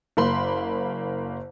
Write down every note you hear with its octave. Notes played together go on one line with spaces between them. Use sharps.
F#1 A#3 B5 C6